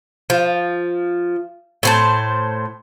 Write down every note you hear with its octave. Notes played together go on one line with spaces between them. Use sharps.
F3
A2 C5 A5